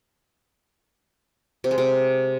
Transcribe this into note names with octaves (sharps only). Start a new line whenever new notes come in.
C3
G#3
C3